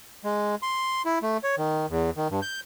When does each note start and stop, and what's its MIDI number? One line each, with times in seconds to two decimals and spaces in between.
0.24 0.55 56
0.63 1.02 84
1.05 1.19 64
1.23 1.37 57
1.44 1.55 73
1.58 1.86 51
1.89 2.10 40
2.17 2.28 51
2.31 2.40 43
2.42 2.60 91